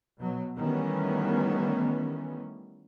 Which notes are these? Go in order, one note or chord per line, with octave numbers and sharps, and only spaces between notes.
B2 F#3
D#3 E3 G3 A3 B3 C#4